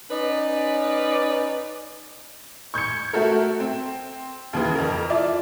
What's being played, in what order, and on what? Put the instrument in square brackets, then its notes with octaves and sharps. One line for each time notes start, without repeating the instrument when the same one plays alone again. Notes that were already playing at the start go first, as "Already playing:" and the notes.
[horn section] C#4 D#4 B4 D5
[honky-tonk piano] C#6 G6 G#6 C#7
A3 F#4 A4 A#4
C4
D#2 C#3 E3
F2 A#4
E4 F4 D5 E5